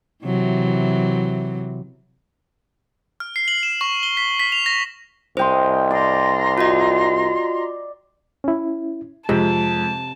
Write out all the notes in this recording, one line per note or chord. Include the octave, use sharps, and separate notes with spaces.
C3 E3 F#3
F6
C7
F#7
E7
C#6
G7
B6
B6
F7
A#6
C2 C5 D#5 G5 C6
D5 A#5 C6
F4 F#4 D#5
C#4 E4
F2 C3 G#3 A5